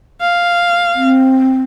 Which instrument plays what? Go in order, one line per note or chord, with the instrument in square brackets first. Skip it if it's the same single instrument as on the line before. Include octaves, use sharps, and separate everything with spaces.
[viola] F5
[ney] C4